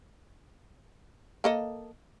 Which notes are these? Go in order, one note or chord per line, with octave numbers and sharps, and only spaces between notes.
A#3 A4 D#5